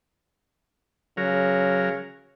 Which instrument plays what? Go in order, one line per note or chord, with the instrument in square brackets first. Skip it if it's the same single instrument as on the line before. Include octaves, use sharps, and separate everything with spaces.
[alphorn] C#3 [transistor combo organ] F#3 A#4